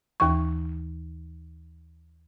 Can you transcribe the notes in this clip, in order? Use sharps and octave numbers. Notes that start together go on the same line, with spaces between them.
D#2 E3 C#6